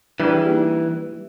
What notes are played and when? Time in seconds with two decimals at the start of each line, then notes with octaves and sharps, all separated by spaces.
0.20 E3 G3 D4 G#4
0.46 A#3 D#4